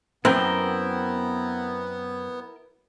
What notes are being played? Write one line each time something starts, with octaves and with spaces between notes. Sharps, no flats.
F#2 B3 C4 E4 A#4 G5